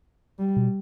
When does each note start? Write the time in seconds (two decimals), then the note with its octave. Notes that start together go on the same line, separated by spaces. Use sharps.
0.39 G3
0.57 B2